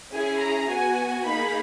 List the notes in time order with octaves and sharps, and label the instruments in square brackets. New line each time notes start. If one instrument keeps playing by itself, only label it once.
[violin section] C#4 E4 G#4 G#5
A#5
B3 F#4 G#5
A#3 D#4 G#4 B5